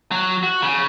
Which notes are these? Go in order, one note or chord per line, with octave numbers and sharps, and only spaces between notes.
F#3
F#4
C#3